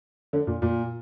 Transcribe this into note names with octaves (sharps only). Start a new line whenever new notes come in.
D3
A#2
A#2